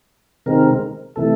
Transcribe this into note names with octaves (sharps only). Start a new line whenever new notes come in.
C3 D#3 G#3 C4 A#4
C3 E3 A3 A4